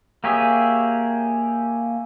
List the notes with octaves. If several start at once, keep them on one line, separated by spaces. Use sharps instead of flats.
A#3 G4 G#4 C#5 E5